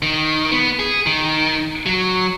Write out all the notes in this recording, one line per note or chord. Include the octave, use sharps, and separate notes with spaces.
D#3
B3
G#4
D#3
F#3